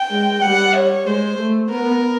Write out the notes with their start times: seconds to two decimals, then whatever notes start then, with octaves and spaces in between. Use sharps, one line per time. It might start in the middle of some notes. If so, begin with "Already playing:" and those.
Already playing: G5
0.11 G#3
0.42 G3 F#5
0.75 C#5
1.06 G#3 C5
1.38 A3
1.70 B3 A#4